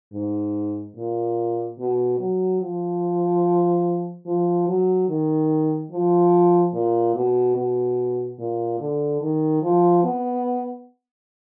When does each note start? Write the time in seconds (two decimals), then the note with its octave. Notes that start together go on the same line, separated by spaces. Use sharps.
0.13 G#2
0.96 A#2
1.79 B2
2.20 F#3
2.61 F3
4.26 F3
4.68 F#3
5.09 D#3
5.91 F3
6.74 A#2
7.15 B2
7.57 B2
8.39 A#2
8.80 D3
9.21 D#3
9.62 F3
10.04 B3